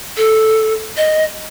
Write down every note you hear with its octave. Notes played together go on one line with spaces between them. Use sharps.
A4
D#5